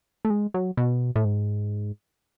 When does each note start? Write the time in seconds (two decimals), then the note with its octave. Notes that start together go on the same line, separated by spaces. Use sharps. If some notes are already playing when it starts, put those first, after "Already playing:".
0.25 A3
0.30 G#3
0.54 F#3
0.77 B2
1.16 A2
1.25 G#2